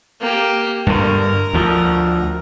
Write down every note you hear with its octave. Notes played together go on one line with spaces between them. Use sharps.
A#3 G4
G2 D3 A#4
D2 F3